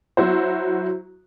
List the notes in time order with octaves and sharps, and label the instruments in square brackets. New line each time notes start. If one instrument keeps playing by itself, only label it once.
[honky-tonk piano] F#3 E4 F#4 C5